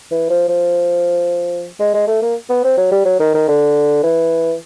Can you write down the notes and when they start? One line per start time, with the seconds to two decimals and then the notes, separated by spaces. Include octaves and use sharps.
0.11 E3
0.30 F3
0.48 F3
1.80 G#3
1.94 G#3
2.07 A3
2.22 A#3
2.50 B3
2.64 C4
2.77 F#3
2.92 G3
3.05 F#3
3.19 D#3
3.34 D#3
3.48 D3
4.03 E3